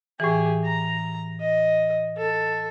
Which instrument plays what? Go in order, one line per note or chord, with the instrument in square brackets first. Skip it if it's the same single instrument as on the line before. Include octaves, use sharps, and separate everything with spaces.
[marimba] A2 E3 [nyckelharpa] G4 G#4
[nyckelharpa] A#5
D#5
A4